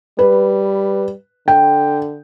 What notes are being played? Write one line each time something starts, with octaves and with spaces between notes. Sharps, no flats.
G3 B4
D3 G5